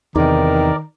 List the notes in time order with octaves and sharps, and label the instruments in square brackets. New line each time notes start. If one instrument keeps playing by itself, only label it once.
[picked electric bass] E2 C3 [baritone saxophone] D#3 [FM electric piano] D#4 [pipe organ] A#4 D5